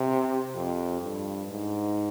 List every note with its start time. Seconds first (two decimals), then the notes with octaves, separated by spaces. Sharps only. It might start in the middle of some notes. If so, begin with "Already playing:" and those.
Already playing: C3
0.55 F2
1.02 G2
1.49 G#2